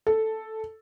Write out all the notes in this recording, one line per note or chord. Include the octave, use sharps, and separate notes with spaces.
A4